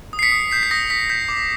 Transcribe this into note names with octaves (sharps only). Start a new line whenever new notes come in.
D#6
C7
B6 C#7
D#6
G6 C7
B6
D#6 A#6
D#6 B6
G6 B6
D6